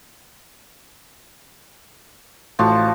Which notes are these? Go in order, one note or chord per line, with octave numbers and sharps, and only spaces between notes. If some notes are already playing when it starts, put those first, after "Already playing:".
A1 A2 F3 F#4 A5